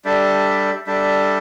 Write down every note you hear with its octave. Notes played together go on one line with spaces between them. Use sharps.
G3 D4 A4 E5
G3 D4 A4 E5